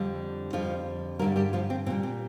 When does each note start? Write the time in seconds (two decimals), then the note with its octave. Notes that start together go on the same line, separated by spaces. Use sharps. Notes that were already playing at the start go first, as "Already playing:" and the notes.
Already playing: F2 D3 G3
0.53 F2 D3 F3 G3 F4
1.19 G2 D3 G3 A#3 A#4
1.36 G3 G4
1.53 F3 F4
1.70 C4
1.86 A#2 C4
1.90 G3
2.03 C4